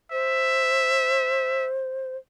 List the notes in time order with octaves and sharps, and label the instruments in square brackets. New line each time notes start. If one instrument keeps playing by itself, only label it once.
[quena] C5 [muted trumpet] E5